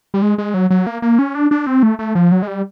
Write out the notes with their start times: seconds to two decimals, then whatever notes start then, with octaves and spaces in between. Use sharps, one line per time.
0.14 G3
0.22 G#3
0.38 G#3
0.54 F#3
0.70 F#3
0.87 A#3
1.02 A#3
1.19 C#4
1.35 D4
1.51 D4
1.67 C4
1.83 A3
1.99 A3
2.15 F3
2.32 F#3
2.42 G#3
2.47 G3